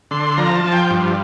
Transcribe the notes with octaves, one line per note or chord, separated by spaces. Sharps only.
D3 C6
F3 A#5
A5
F3
G5
G2